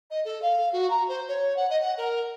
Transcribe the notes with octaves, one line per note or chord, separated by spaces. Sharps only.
D#5
A4
F5
F#4
A#5
C5
C#5
F#5
D#5
F#5
A#4